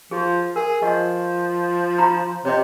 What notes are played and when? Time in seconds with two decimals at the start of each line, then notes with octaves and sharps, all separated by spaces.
0.11 F3 G#4
0.56 G#4 A#4
0.82 F3 D#5 C#6
1.98 F4 A#5 C6
2.45 C3 C#5 D#5